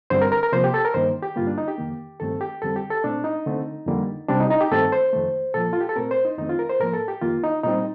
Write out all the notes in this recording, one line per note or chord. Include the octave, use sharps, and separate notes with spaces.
G2 D3 G3 C4 C5
A#4
A#4
A#4
C3 F3 A#3 C5
G4
A4
A#4
G2 D#3 A#3 C5
G4
G2 D3 G3 A#3 F4
D4
D#4
G4
F2 D#3 A#3
G2 D#3 A3 C4 A4
G4
F2 D3 G3 C4 A4
G4
A4
A#2 A3 C4 D4
D#4
D3 A3 C4
F2 D3 G3 A#3
C3 G3 C4 D4
D#4
D#4
G4
G2 D#3 A3 C4 A4
C5
F2 D#3 A3
A#2 F3 A#3 A4
F4
G4
A4
A#2 A3 C4 A#4
C5
D#4
F2 D#3 A3 C4 D#4
F4
A#4
C5
A2 F3 A#3 A#4
A4
G4
F2 D#3 A#3 F4
D#4
A#2 G3 C4 D#4